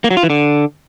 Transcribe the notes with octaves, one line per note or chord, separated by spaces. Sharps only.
A#3
F#3
F4
E3
D3